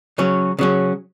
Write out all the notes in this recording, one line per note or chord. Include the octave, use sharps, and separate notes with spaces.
C#3 F#3 C#4
C#3 F#3 C#4